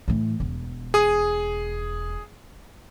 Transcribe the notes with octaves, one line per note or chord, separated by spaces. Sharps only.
A2 E3
E1
G#4 D#6